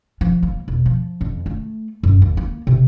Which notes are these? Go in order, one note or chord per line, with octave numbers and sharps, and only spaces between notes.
F3
A#3
E1
F3
F2
A3
F#2
D#2
A#3
C3